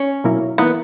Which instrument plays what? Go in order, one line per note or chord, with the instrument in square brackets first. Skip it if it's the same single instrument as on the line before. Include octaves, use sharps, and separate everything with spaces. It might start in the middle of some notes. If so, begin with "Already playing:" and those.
Already playing: [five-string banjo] C#4
[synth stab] B2 F#3 A#3 E4 A#4
[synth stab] E3 A#3 E4 A#4 [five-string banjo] B3